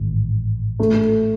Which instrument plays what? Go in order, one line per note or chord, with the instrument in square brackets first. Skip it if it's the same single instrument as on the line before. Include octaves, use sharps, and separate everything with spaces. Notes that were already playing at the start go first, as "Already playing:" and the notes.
Already playing: [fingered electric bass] A1 G#2 D#3
[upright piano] A3